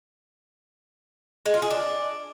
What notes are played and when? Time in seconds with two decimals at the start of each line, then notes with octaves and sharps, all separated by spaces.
1.46 G#3
1.54 F4
1.62 G#4
1.70 D4